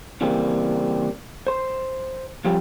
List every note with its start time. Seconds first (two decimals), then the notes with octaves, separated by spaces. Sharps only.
0.21 C#3 E3 G3 A#3 C4
1.47 C5 C6
2.45 F3 G3 C4 F4 G4